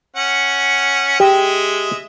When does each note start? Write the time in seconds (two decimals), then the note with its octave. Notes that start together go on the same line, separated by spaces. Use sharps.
0.16 C#4 F#5
1.20 G#3 G4 D#5 E5